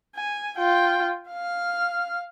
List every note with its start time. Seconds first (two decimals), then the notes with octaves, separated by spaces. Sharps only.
0.16 G#5
0.58 F4 G5
1.30 F5 F6